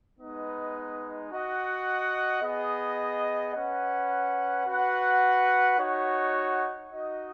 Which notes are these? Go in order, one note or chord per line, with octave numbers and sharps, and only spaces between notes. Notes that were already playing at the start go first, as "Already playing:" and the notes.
G#3 B3 D#4 B4 D#5
F#4 D#5 F#5
B3 G#4 D#5
C#4 B4 F#5
F#4 B4 F#5
D#4 F#4 C#5 F#5
D#4 F#4 D#5